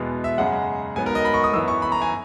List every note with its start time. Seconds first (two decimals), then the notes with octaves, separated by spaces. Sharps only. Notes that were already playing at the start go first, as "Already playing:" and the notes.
Already playing: E2 B2 G#3 B3
0.24 E5
0.38 F#2 C#3 G#3 F#5
0.96 G#2 F#3 B3 G#5
1.06 A#4
1.15 D#5
1.25 B5
1.34 C#6
1.44 D#6
1.53 F#2 E3 B3 E6
1.68 C#6
1.82 B5
1.92 A#5
2.02 G#5